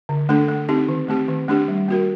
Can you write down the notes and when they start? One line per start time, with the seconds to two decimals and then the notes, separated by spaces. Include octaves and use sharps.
0.09 D3
0.29 A3 D4 A4
0.49 A3
0.69 C4 D#4 G4
0.89 D#3
1.08 A3 C4 G4
1.28 D#3
1.48 A3 D4 G4
1.68 G3
1.88 A#3 F#4 A#4